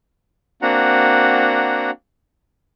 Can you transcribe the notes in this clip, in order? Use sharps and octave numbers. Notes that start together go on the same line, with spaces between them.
A#3 C4 D4 F#4 F#5 A#5